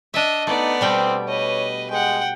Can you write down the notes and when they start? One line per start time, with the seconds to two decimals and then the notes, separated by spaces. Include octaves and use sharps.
0.14 D4 D#5 E5
0.47 A3 B3 D#4 D5
0.81 B2 G3 C4 G5
1.28 B4 C#5 D#5
1.90 G#3 F#5 G5